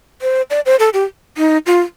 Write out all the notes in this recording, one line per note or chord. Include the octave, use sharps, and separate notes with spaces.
C5
D5
C5
A4
G4
D#4
F4